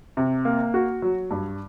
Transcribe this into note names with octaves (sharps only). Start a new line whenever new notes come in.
C3
A#3
F#4
F#3
G2